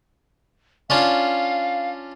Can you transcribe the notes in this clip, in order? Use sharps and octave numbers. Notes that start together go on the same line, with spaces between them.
C#4 D4 F4 F5